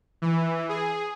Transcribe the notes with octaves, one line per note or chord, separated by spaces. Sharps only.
E3
G#4